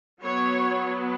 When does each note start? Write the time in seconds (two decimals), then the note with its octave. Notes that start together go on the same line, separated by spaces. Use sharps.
0.21 F#3 B3 C#5